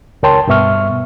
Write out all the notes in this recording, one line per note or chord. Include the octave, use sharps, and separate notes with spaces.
C#2 A#4 C#5 G5 A5 C6
G2 B2 B3 E5 C#6 F6